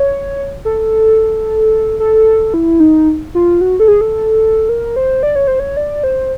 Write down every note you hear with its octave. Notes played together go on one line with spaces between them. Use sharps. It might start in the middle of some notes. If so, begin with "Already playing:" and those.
Already playing: C#5
A4
A4
E4
D#4
F4
F#4
A4
G#4
A4
A#4
C5
D5
C#5
C5
C#5
D5
C5